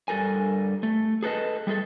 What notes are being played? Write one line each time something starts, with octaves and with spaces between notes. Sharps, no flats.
G2 G3 A4 A#4 G#5
A3
G#4 A4 B4 D#5 A5
G3 A3 G#4 A4